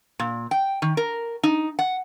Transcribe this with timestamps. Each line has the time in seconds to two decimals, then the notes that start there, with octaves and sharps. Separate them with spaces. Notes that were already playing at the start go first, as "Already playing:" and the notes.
0.20 A#2
0.51 G5
0.82 D#3
0.97 A#4
1.43 D#4
1.79 F#5